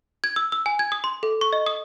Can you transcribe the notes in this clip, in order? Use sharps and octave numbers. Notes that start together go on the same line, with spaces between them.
G#6
E6
E6
G#5
G#6
D#6
C6
A4
C#6
D#5
D#6